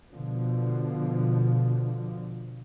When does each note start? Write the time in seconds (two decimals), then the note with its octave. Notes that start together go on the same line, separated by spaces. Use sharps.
0.12 B2 D3 F3